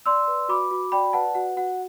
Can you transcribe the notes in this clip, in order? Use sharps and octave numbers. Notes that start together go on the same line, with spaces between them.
D5 C6 E6
B4
F#4 B5 D6
F#4
D5 G5 B5
B4 F#5 A5
F#4 F#5
F#4 F#5